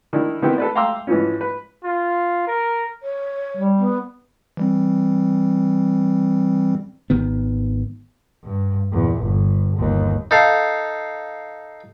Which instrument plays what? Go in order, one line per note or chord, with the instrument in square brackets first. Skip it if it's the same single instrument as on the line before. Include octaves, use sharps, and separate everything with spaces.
[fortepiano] D#3 D4 E4
D#3 B3 C4 E4 G4
A4 B4 D5
F5 G5 A#5 C6 D6 E6
G#2 E3 F3 C#4
B4
[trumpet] F4
A#4
[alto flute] C#5
[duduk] G3
[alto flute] B3
[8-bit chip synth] E3 G3 C4
[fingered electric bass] G#1 D#3 B3
[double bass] G2
E2 A#2
G1
G1 D#2
[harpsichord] D#4 A4 F5